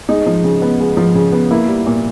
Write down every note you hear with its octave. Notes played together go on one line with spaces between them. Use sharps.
G#3 D#4
F3
C#3
B3
G#3
F3
C#3
B3
A#3 E4
G3
A#2